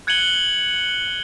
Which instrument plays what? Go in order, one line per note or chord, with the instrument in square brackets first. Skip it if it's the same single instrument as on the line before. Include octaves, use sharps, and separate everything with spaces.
[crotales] F#6 G#6 C#7 D#7 F#7 G7